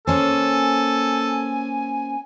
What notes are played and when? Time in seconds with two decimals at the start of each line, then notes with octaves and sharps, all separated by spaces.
0.07 A#3 C#4 A4 C5 G#5